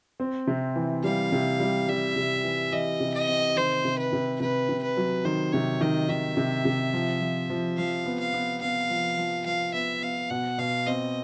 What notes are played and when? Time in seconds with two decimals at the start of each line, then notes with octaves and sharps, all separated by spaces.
0.20 C4
0.47 C3
0.76 E3
1.04 G3 F5
1.32 C3
1.60 G3
1.88 G3 E5
2.16 C3
2.44 E3
2.72 E3 D#5
3.00 C3
3.14 D#5
3.28 C4
3.56 D#3 C5
3.85 C3
3.98 B4
4.13 C3
4.40 C3 B4
4.69 C3
4.83 B4
4.97 F#3
5.25 D#3 C5
5.53 C3 C#5
5.81 D#3 D#5
6.09 D#3 E5
6.37 C3
6.65 C3
6.93 F3
7.21 F3
7.50 F3
7.77 F3 F5
8.06 B3
8.20 F5
8.34 B3
8.62 B3 F5
8.90 F3
9.18 F3
9.46 F3 F5
9.74 B3 E5
10.02 B3 F5
10.30 B2 F#5
10.58 B2 F5
10.87 C4 D#5